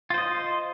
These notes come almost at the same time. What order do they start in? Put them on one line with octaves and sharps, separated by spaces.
F4 C5 D#5